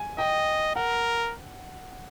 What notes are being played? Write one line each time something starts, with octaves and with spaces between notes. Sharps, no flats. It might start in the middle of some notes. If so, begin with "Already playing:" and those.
Already playing: G#5
D#5 G5
A#4 F#5